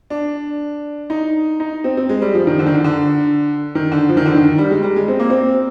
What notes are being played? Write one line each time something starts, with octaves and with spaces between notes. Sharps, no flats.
D4
D#4
D#4
C4
C4
G#3
G3
F3
D#3
D3
D#3
D3
D3
D#3
D3
F3
D#3
D3
D#3
G3
G#3
G3
G#3
C4
A#3
C4